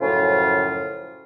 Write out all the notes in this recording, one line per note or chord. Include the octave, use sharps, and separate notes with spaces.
F#2 A2 C#3 F3 F4